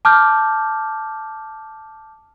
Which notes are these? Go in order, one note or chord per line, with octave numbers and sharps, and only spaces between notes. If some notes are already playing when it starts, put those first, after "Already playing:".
A5 D6 F6 G6